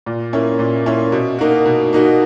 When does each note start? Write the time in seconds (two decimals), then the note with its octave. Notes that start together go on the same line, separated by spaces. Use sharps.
0.06 A#2
0.33 A#3 C#4 E4
0.59 A#2
0.86 A#3 C#4 E4
1.12 B2
1.39 A#3 D#4 F#4
1.66 B2
1.93 A#3 D#4 F#4